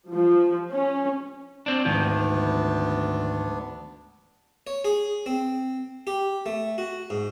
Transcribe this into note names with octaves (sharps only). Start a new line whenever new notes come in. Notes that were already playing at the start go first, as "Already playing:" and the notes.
F3
C#4
C4 D4
D2 G#2 D#3 F3 B3 D4
C#5
G#4
C4
G4
A3
F#4
G#2